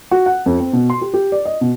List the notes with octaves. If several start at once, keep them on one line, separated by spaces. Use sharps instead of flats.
F#4
F#5
F2
C4
B2
C6
G4
G4
D5
D#5
B2